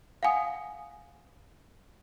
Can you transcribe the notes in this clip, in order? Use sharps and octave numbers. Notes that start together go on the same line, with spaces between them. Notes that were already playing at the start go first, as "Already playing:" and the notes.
F5 F#5 G#5 D#6